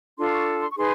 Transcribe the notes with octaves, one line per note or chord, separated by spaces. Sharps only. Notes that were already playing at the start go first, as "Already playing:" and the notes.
D4 F4 A4 C6
C#6
C6
C#6
D#4 G#4 B4 C6